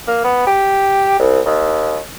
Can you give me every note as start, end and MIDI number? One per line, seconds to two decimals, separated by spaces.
0.08 0.21 58
0.24 0.43 59
0.47 1.17 67
1.20 1.40 36
1.46 1.98 39